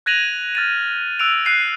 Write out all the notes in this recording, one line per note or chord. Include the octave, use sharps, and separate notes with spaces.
F#6 G#6 A#6 D#7 F7 F#7
F6 A6 D#7
E6 F#6 D7 F7
F#6 C7 D#7